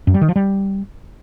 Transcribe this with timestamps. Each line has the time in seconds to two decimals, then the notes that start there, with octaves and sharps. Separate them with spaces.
0.07 F#2
0.14 G3
0.21 D#3
0.28 F3
0.36 G3